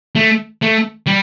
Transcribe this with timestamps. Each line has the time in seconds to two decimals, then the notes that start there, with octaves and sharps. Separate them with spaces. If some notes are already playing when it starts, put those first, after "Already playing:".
0.16 A3
0.62 A3
1.07 G3